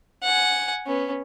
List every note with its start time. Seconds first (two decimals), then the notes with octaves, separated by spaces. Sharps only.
0.23 F#5 G#5
0.86 B3 C#4